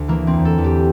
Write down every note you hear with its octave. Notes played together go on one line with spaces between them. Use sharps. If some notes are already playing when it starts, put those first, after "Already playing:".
Already playing: D2
E3 A#3
C4
E2
A4
E2
G4